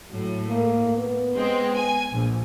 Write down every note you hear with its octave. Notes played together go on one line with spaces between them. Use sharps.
A2 F#3
A#3
B3
G#3 C4
G#5
A#1